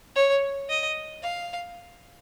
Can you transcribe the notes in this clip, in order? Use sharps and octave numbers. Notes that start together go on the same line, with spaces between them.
C#5
D#5
F5